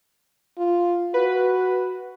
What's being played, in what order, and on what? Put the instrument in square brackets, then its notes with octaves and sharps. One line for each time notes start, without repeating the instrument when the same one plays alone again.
[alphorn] F4
[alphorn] F#4 [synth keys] B4